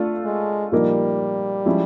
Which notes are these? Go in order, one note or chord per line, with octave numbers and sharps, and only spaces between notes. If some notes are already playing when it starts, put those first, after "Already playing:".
Already playing: A3 D4 F4 A4
G#3
A#2 F3 G3 A#3 D#4
F3 G#3 C#4 E4